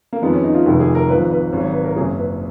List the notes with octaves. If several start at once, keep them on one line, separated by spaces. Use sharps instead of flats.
A#3
F2 D#3 G#3 B3
C#4
D#4
F4
F1 F2 D#3 G#3 F#4
G#4
A#4
G#1 G#2 F3 B4
B4
G#1 G#2 F#3
C#5
B4
A#4
F#1 F#2 C#3 F#3 G#4
B4